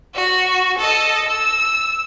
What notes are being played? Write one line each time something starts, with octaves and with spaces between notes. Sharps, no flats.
F#4
A4 D#5
E6